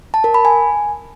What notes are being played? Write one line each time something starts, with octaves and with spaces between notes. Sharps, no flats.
A5
A#4
B5
G#5